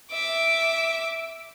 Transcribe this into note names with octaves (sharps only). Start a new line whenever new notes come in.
E5 D6